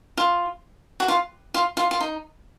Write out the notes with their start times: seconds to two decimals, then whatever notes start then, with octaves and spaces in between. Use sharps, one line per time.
0.17 F4
1.00 F#4
1.08 F4
1.54 F4
1.77 F4
1.91 F4
2.01 D#4